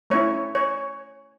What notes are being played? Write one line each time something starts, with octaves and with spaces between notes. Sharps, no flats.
A3 C#4 E4 C#5
C#5